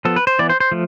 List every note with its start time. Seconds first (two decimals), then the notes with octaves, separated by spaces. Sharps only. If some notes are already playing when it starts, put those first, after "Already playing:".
0.05 F3 B3 A4
0.16 B4
0.27 C5
0.39 E3 B3 D5
0.49 C5
0.60 C5
0.72 F3 A3